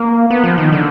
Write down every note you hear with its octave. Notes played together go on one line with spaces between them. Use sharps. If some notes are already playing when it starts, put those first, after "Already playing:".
Already playing: A#3
B3
F3
D#3
D3